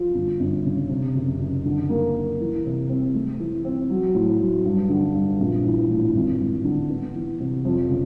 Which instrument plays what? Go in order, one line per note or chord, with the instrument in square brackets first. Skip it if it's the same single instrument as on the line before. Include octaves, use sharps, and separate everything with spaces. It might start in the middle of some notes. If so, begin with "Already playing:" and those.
Already playing: [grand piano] F3
G1
G1
C#3
C3
F#1
F#1
D3
A#3
A#3
E3
C3
C4
A3
E3
C4
F#3
A2
F#3
G2
D3
G2
A#1
E3
A2
G#1
G#1
D3
B3
E3
C3
F2
C#3